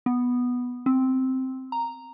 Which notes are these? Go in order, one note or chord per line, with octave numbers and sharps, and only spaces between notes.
B3
C4
A#5